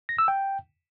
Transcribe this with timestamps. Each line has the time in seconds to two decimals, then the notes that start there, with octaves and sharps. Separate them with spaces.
0.09 A#6
0.18 E6
0.28 G5